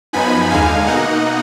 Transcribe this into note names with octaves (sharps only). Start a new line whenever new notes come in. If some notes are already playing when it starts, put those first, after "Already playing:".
F#2 F3 B3 D#4 G#5 B5
D#2 D3 G#3 D#4 F5 G#5
B2 A#3 D#4 D#5 F#5